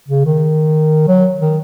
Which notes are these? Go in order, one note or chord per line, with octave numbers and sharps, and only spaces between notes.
C#3
D#3
F#3
D#3